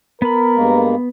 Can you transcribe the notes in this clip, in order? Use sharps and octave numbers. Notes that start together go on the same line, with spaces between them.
B3 A#4 B5
G2 G#3 A#3